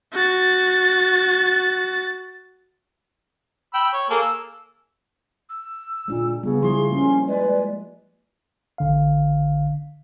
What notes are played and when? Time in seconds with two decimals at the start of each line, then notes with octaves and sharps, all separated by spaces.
0.13 F#4 A6
3.74 G5 B5 E6
3.93 C#5
4.10 A#3 G#4 A4
4.21 E6
5.49 E6
6.08 A#2 G#3 D4
6.43 C#3 G3 B3
6.62 F3 G3 E4 G#4 C6
6.91 A#3 C#4
7.28 G#3 B4 D5
8.78 A1 D3 F5